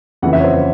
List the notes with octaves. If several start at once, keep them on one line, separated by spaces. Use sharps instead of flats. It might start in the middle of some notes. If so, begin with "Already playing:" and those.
F2 C#3 E3 F#5
E5
C#5
C5